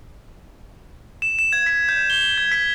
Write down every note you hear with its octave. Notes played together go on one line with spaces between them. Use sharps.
E7
E7
G#6
B6
G6
G7
G#6
B6